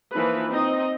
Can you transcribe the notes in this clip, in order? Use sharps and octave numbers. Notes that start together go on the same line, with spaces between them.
E3 F3 A#3 D#4 B4
C4 D#4 D#5